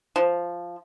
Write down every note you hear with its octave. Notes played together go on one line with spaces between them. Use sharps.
F3